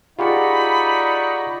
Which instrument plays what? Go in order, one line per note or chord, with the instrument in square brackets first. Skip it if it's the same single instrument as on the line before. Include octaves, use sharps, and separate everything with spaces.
[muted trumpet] D#4 [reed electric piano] F4 G4 G#4 [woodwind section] D5 F#5 C#6 [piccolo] B5